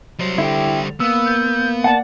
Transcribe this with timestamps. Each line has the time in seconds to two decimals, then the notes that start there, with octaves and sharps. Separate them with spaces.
0.19 F#3 G3 C5
0.38 D3 E4 G4
1.00 A#3 B3 E6
1.26 G6
1.84 D5 F#5 A5